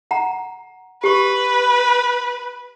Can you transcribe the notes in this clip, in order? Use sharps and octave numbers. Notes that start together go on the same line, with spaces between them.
F#5 A#5
G4 B4 C#6